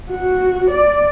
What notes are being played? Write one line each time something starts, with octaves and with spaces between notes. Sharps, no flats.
F#4
D5